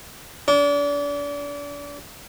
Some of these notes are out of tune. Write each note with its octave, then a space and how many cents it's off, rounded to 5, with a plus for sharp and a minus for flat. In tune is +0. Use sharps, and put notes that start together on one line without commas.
D4 -35